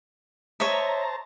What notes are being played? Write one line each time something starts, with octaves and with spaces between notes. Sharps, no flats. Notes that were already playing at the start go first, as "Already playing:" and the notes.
C5 C#5 D#5 E5 A5 A#5